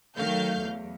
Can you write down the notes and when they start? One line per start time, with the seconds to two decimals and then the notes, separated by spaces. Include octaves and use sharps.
0.17 D#3 F#3 A3 F5 G6
0.60 E2